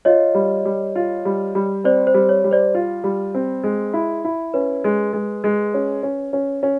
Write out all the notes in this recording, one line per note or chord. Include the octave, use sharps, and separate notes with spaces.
F4 C#5 D#5
G3
G3
F4
G3
G3
C4 C5 D5
C5
G3
C#5
G3
C5 D5
F4
G3
C4
G#3
E4
E4
C#4 B4
G#3
G#3
G#3
C#4
C#4
C#4
C#4